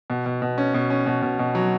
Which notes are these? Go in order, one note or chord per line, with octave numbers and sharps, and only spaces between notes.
B2
B2
B2
C#4
B2
C#4
B2
B2
B2
F#3